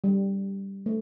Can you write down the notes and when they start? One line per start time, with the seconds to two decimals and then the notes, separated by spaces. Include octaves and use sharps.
0.04 G3
0.86 A3